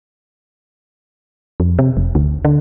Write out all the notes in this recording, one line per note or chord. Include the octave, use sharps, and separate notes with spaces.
F2
C3
F1
D2
D3